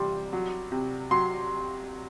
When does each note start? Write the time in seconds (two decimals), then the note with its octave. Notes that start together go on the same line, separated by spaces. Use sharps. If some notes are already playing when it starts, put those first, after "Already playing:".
Already playing: C3 E3 G3 C6
0.33 F#3
0.72 C3
1.11 F#3 C6